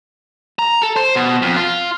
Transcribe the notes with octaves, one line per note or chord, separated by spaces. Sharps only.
A#5
A4
C5
B2
F2
F4